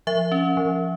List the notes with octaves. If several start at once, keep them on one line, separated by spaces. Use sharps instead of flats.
F3 E5
C#4
F3